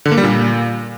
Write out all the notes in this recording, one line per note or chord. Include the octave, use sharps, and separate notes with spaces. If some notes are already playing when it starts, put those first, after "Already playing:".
D3
A#3
G3
A#2